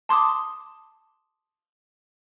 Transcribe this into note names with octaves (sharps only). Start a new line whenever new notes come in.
A5 C6 D6 D#6